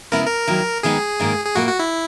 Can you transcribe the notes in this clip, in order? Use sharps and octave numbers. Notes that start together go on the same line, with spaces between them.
C#3 G#3 B3 E4 A#4
A#4
D#3 F#3 A#3 E4
D#3 G#3 B3 D#4 G#4
G#2 D#3 A#3
G#4
A#2 A#3 E4 F#4
F#4
E4